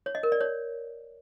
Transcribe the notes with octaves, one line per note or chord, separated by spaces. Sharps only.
C#5
D#5
A#4
D5
C#5